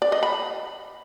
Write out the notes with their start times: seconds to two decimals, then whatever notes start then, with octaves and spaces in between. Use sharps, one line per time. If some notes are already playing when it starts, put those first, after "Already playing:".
0.02 D5
0.12 D#5
0.23 B5